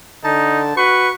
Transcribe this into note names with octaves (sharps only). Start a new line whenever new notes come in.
D3 D#4 A5
F#4 B4 C#6